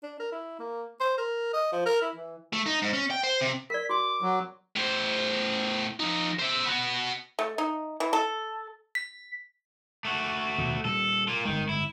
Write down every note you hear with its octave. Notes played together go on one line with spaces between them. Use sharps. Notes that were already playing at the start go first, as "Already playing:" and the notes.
D4
A#4
E4
A#3
C5
A#4
D#5
F3
A#4
E4
E3
A3
D#4
G#2
C#4
G5
C5
C3
A#4 D5 B6
F#4 C6 D6
F#3
A2 C5
F3 D#4
C5 E5
B3 F#4
A3
D#4
E3
A4
B6
A3 F#4
D#2 B2
A#2 G3 A4
A#3 F4
G1 D#3 G#3
E4